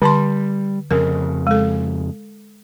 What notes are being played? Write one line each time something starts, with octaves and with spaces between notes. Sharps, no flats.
D3 G3 A5 C6
F2 C#3 A#4
G#3 A4